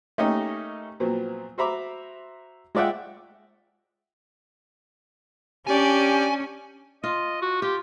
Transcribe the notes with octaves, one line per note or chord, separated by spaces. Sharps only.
A3 A#3 C#4 D#4 G4 D#5
A#2 F3 F#3 B3 C4
F#4 C5 E5 A#5 B5 D6
G#3 F4 D5 E5 F#5 G5
C#4 D4 G4 D5 G#5
F4 D#5
F#4
F4 G4